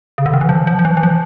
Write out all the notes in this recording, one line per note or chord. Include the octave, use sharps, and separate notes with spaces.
C#3
D3
D#3
E3
F3
F3
F3
E3
E3
F3